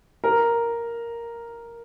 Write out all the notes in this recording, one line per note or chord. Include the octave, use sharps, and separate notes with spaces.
A#4